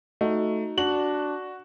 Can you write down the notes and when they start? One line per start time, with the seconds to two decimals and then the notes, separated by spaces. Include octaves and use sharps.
0.21 A3 D#4 F#4
0.78 D4 F#4 F#7